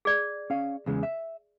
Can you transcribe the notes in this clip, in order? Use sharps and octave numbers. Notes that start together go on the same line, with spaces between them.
G#4 D5
C#4 F5
E2 C#3 G#3
E5